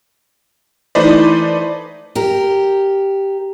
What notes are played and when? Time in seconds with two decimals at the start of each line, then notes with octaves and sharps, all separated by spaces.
0.95 E3 A3 D#4 B4 C5 D5
2.15 G4 A#4